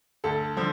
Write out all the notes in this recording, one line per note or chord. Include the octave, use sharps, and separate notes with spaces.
D2 A4
D3 F3